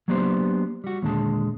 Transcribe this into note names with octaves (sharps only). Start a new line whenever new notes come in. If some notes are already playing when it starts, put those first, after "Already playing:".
F#3 A#3 B3 D4 G4 C5
G3 F#4
D#2 A#2 D3 G#3 A5